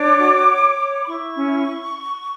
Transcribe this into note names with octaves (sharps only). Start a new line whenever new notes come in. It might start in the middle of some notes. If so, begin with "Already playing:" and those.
Already playing: D4 C#5 D6
F#4
C#5
C#5
B5
E4 C#6
C#4